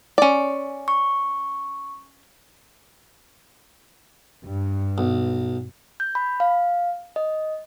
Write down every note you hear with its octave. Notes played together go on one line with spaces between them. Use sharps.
C#4 D5
C#6
G2
B1
G6
B5
F5
D#5